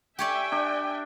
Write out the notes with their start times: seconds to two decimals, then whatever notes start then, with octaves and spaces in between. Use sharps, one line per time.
0.19 G4 C#5 D5 E5 G5 G#5
0.52 D4